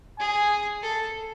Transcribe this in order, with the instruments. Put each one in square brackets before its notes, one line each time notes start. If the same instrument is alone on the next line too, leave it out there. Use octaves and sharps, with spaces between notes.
[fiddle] G#4 [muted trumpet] G#5
[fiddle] A4